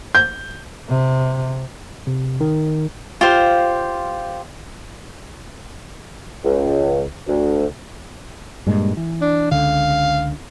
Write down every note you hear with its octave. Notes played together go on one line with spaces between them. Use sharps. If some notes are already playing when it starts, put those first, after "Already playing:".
G6
C3
C3
D#3
F4 G4 C5 F5
C#2
D2
G2 A#2 G#3
E3
D4
C#2 D3 F5